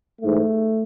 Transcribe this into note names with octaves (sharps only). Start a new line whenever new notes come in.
G#2 E3 A3